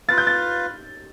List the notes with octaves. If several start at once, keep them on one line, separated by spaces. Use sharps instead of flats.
F4 B4 F5 A6
G6
A6